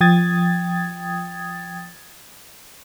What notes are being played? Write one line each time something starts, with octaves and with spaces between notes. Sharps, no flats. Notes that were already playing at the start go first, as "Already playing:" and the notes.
F3 G5 D#6 G#6 A6